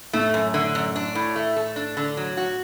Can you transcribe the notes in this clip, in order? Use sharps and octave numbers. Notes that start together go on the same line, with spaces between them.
A2 A3
F#2
D3
F#2
D4
A2
A3
A4
D4
D3
F#3
F#4